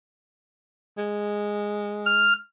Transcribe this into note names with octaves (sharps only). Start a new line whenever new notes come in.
G#3
F6